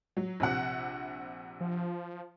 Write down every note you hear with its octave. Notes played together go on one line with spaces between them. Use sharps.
F#3
A#1 C3 F#5
F3